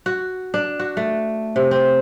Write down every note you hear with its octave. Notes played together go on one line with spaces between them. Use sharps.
F#4
D4
F#4
A3
C3
C4